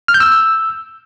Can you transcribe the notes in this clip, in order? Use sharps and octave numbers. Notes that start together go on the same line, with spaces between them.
F6
G6
E6